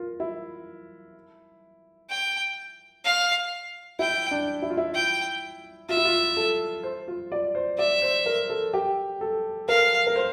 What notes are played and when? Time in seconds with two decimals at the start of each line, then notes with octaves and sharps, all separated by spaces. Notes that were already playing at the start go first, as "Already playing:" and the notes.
Already playing: F4 A#4
0.20 E4
2.10 G5
3.04 F5
3.99 E4 G5
4.31 D4
4.62 E4
4.70 F4
4.77 E4
4.94 G5
5.89 F4 E5
5.97 E4
6.05 F4
6.37 A4
6.83 C5
7.08 F4
7.32 D5
7.55 C5
7.78 D5 E5
8.02 C5
8.26 A#4
8.50 A4
8.74 G4
9.21 A4
9.68 A#4 F5
10.07 A#4
10.16 C5